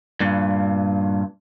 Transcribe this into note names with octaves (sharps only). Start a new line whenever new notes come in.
G2 A#2